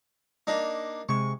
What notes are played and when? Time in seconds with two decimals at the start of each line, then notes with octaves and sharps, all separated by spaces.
0.47 A#3 D4 D#4
1.09 C3 G#3 C#6